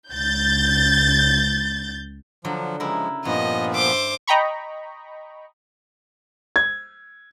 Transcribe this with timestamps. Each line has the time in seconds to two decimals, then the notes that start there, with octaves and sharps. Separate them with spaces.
0.11 C#2 G6 A6
2.45 D3 F3 F#3
2.80 C#3 F3 G#3 E4 A#4
3.25 G2 A#2 F3 B3 D#5
3.74 C5 E5 D6
4.27 D#5 G5 A#5 B5 C#6
6.56 G#6